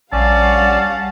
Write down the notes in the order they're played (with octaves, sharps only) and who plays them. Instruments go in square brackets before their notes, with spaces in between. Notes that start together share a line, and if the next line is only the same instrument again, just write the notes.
[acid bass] A#1 [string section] G3 F5 F#5 [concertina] C#4 D5 [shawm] A5